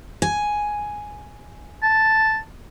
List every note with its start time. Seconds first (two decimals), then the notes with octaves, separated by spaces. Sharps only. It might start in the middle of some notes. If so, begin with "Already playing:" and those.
0.22 G#5
1.83 A5